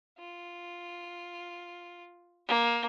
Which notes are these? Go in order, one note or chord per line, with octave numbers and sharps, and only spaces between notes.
F4
A#3